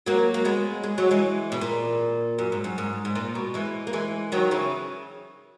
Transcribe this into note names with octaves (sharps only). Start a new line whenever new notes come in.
F#3 A#3
A#3
G#3 B3
G#3
F#3
E3 G#3
B2
A#2
F#2
G#2
F#2
G#2
G#2
A#2
B2
E3 G#3
A#3
E3 G#3
D#3 F#3
C#3 E3